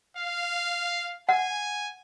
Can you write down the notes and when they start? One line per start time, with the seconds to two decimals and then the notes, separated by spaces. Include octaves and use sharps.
0.17 F5
1.29 F#5 G#5